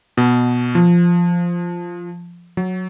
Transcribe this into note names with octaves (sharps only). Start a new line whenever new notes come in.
B2
F3
F#3